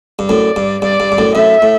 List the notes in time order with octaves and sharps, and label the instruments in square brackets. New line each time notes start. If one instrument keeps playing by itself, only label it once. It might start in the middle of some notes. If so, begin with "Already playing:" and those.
[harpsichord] G2
[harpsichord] F#2 A2 [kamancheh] D5
[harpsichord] G2
[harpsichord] G2 [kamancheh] D5
[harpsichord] G2
G2
F#2 A2
[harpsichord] F#2 A2 [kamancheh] E5
[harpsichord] A2